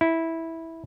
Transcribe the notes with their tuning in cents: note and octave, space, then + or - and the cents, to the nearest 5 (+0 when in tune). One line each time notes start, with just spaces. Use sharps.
E4 -10